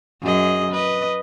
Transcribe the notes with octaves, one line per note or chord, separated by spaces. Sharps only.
F#2 G#4 D#5
B4 D#5